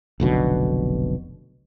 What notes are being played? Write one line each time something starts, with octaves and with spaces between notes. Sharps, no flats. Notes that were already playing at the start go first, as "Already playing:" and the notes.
F1 B1 B2 D3